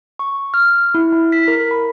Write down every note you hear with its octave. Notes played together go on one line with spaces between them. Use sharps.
C#6
F6
E4
E4
B6
A#4
B5